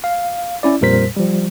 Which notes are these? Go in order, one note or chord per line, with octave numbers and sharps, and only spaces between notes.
F5
C#4 E4 D5
F2 A#2 G3 A#4 C5 B6
F3 G3